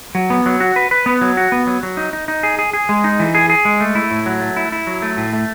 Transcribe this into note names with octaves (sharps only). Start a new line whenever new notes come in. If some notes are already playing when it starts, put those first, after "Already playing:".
F#3
B3
F#3
F#4
B4
B4
B3
F#3
F#4
B3
F#3
F#3
D#4
D#4
D#4
G#4
G#4
G#4
G#3
D#4
E3
G#4
G#4
G#3
A3
E4
A2
F#3
A3
E4
E4
F#3
A3
A2
A3